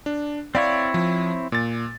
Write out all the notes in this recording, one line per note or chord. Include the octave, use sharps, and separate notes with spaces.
D4
C4 E4 C#5 D5 F5
F3
A#2 A6